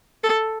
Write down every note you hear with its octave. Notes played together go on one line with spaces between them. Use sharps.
A4